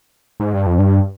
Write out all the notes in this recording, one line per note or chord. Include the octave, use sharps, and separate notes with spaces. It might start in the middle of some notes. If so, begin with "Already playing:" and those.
G#2
G2
F2
G2